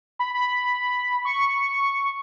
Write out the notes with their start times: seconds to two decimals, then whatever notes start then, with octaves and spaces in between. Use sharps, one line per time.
0.19 B5
0.34 B5
1.25 C#6